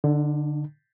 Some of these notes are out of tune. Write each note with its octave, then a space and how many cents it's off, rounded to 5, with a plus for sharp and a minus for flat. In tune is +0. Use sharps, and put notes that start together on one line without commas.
D3 +5 D#4 -35